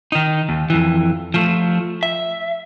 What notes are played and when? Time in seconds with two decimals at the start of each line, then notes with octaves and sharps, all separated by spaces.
0.12 D#3 D#4
0.49 D#2
0.70 F2 E3
1.34 F3 A3
2.03 E5